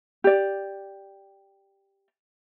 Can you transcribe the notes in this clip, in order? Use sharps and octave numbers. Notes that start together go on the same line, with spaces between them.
G4 D5